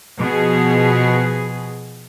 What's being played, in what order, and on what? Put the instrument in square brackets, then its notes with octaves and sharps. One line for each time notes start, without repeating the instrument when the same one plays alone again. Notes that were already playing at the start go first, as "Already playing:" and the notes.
[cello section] B2 F3 G#4